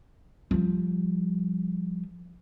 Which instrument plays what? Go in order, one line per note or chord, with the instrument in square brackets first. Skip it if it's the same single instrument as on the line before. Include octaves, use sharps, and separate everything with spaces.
[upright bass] F3 G3